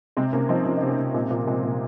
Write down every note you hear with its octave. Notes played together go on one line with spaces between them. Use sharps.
C3 G#3 C4
C3 A#3 C#4
F3 C4 D#4
F3 C#4
D#4
C3
A#3 C#4
C3
A#2 G#3 C4
A#2 A#3
A#2 G#3 C4
A#2